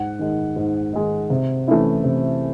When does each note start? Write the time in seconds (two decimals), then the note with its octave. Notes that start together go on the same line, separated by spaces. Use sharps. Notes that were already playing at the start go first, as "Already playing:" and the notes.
Already playing: G#2 F#5
0.19 D#3 G#3 D#4
0.56 G#2
0.93 D#3 G#3 D#4
1.30 C3
1.68 E3 A3 C#4 E4
2.04 C3